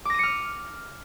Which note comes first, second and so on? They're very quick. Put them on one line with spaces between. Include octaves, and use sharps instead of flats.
D6 A#6 D#7 C#7 F6